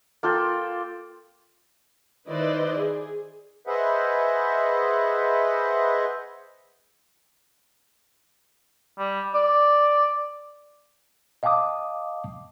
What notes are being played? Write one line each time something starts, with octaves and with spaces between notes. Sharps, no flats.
A#3 F4 A4 G5
D#3 E4 B4 C5 D5 D#5
G#4
G#4 B4 C5 D#5 E5 F#5
G3
D5
D#5 F5 G5 A5 D6 D#6